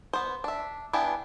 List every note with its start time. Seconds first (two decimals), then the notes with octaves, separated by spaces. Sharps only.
0.13 B3 C5
0.44 D4 E5
0.93 B3 D4 E4 G4 G#4